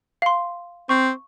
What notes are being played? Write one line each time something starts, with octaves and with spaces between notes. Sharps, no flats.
F5 C6
C4 C#6